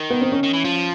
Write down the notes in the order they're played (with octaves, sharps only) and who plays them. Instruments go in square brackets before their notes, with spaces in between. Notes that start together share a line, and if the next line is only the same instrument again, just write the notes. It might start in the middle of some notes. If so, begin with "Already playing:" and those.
Already playing: [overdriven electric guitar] D#3
[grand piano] B3
C4
C#4
[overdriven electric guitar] D#3
E3
F3